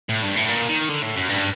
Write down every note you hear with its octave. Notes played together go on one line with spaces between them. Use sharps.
A2
G2
A2
A#2
D#3
D3
A2
F#2
G2